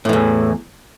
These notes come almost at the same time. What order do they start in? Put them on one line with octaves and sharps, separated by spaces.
A2 E3 E2